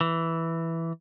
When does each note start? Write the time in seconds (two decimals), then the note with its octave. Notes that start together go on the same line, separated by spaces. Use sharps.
0.01 E3